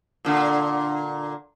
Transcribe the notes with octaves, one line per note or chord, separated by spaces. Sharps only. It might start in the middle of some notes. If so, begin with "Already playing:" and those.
A#2 D3